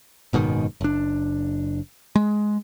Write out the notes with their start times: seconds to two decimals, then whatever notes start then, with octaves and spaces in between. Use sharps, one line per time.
0.33 F#1 G#2 B2 D#3
0.81 F#1 D4
2.16 G#3